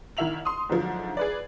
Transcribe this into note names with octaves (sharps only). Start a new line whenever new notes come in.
C2 D#3 E4 E5 F7 F#7
C6 D#6
G#2 D3 F3 F#3
G#4 B4 D5